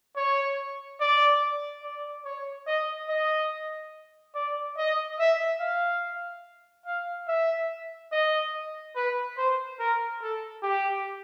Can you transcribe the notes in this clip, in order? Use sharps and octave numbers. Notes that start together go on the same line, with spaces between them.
C#5
D5
D5
C#5
D#5
D#5
D5
D#5
E5
F5
F5
E5
D#5
B4
C5
A#4
A4
G4